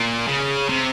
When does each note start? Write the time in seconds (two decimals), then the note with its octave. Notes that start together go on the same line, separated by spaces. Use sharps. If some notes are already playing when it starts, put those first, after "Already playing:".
Already playing: A#2
0.27 C#3
0.69 C3